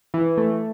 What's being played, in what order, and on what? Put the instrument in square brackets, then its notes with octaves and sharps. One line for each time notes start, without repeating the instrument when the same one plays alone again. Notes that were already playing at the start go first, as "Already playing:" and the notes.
[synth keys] E3
A3